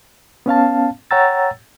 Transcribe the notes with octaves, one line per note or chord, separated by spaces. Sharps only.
B3 C#4 F5 A5
C#5 F#5 G5 A#5 E6 A6